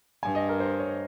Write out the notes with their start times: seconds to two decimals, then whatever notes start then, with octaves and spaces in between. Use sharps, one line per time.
0.23 G2 G#5
0.35 D#5
0.49 A#4
0.60 C5
0.80 C#5